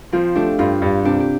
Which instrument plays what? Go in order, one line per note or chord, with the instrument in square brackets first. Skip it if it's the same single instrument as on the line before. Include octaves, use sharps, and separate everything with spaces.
[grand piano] F3 [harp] C4 F4
[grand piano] A3 [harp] D4 G4
[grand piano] G2 [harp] C4 F4
[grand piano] G2
[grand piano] C3 [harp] D4 G4
[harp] G4